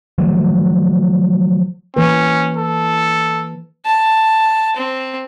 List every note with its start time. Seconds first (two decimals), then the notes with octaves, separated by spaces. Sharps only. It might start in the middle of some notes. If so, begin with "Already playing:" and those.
0.18 D#3 F3 F#3 A3
1.97 E3 A#3 C#4 B4
2.57 A4
3.85 A5
4.76 C4